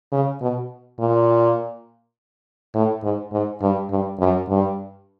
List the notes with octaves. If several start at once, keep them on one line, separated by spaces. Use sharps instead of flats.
C#3
B2
A#2
A2
G#2
G#2
G2
G2
F#2
G2